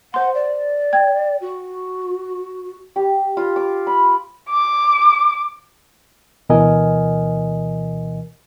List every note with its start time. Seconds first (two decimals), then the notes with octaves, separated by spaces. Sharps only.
0.14 C5 F#5 C6
0.34 D5
0.93 G5 G#6
1.41 F#4
2.96 G4
3.37 F4
3.56 D6
3.87 B5
4.49 D6
6.49 D2 B2 E3 A#4 D#5 G#5